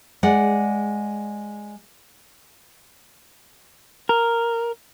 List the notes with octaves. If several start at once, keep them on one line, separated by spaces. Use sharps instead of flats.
G#3 D5 F#5
A#4